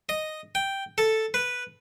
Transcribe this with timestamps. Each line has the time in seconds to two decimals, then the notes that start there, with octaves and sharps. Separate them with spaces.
0.09 D#5
0.55 G5
0.98 A4
1.34 B4